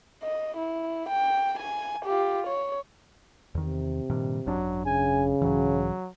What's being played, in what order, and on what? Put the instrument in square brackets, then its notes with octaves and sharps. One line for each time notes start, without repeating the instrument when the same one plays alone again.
[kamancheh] D#5
E4
G5
G#5
F4 G4
C#5
[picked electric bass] E2 D#3 [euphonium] C3
[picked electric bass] G2 A#2 D#3
[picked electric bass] G#1 F#2 D4 [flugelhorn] F#3
[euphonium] C#3 [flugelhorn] G#5
[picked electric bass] B1 G#2 E3 [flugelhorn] F#3